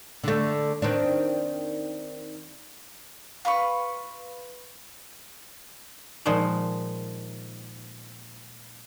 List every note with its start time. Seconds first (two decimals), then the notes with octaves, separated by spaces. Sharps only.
0.24 D3 A3
0.82 D#3 C4 D4
3.45 F4 B4 B5 C#6
6.26 A#2 D#3 F3 G#3